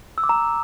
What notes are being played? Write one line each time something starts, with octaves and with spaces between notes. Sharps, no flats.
E6
D6
A#5